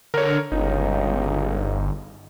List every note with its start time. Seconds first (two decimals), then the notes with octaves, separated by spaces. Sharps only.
0.14 D3 A#4 C#5
0.52 G1 C#2 D#4